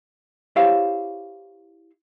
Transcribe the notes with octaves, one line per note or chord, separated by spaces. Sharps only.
E4 G4 C5 C#5 E5 F5